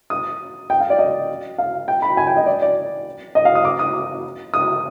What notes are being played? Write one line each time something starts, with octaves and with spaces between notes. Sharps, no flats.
D#6
G5
F5
D5
D#5
F5
G5
B5
G#5
G5
D#5
D5
D5
D#5
F5
D#6
D6
D#6
D#6